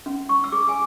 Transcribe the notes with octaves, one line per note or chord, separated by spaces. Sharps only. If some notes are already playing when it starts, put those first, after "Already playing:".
C#4
C#6
E6
G#4 D6
G#5